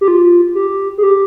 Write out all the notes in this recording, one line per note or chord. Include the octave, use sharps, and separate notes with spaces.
G4
F4
G4
G#4
G4